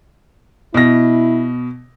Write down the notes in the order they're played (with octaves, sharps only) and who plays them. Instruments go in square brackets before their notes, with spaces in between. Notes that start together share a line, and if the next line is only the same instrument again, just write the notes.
[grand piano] B2 A#6 [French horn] E4